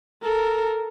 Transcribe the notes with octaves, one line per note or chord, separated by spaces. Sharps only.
A4 A#4